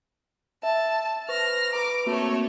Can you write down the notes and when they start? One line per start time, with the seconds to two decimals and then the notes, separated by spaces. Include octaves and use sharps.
0.63 E5 A5
1.29 B4 C5 C#6 F6 A#6
1.73 B4 A#5 D6
2.06 A3 A#3 C4 F#4 C#5